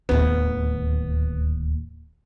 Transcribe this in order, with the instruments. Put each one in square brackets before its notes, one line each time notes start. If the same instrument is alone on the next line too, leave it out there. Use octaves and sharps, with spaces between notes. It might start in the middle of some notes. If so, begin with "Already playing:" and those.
[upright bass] D1 D#2 [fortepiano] B3